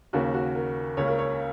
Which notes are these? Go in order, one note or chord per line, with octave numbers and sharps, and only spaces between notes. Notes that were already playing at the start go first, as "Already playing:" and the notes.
D#2 C#3 A#3 F#4
F#4
A#4
C#2 C#3 A#3 C#5
A#4
C#5